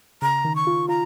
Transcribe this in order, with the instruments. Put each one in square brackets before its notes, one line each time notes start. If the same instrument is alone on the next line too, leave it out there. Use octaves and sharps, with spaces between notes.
[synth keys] C#3 [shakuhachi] A#5
[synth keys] D#3
[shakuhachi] C#6
[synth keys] F4
[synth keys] F4 [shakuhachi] A#5